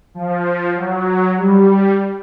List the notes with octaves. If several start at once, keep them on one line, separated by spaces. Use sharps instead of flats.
F3
F#3
G3